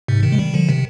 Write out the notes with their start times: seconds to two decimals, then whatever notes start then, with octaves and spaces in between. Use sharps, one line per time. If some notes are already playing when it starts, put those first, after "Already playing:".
0.08 G#2 C3
0.23 C3 D#3
0.32 G#3
0.38 D#3 G3
0.54 D3 F3
0.69 C3 D#3